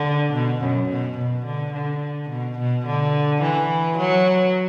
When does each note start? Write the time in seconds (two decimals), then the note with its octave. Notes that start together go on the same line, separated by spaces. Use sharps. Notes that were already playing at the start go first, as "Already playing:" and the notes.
Already playing: D3
0.33 B2
0.61 F#2
0.89 B2
1.18 B2
1.45 D3
1.73 D3
2.30 B2
2.58 B2
2.87 D3
3.42 E3
3.99 F#3